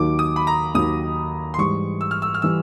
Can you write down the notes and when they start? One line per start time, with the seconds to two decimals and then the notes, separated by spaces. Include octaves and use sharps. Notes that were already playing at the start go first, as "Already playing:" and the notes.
Already playing: D#2 D#3 F#3 D6
0.19 D#6
0.36 B5
0.47 A#5
0.75 D#2 D#3 F#3 D#6
1.54 C6
1.58 G#2 E3 G3 C#6
2.01 E6
2.11 F6
2.22 E6
2.34 F6
2.42 E3 G3 E6